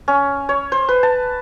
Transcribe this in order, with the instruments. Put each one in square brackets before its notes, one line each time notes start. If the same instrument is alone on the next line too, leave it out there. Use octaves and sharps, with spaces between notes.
[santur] C#4
C#5
C5
B4
A5